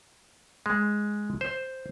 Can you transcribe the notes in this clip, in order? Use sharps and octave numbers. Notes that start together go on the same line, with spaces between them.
G#3
C5